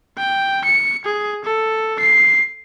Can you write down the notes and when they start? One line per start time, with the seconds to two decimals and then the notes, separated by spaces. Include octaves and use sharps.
0.18 G5
0.65 C#7
1.05 G#4
1.44 A4
2.00 C7